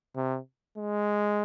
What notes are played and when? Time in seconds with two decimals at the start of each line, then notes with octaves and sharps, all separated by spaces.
0.16 C3
0.78 G#3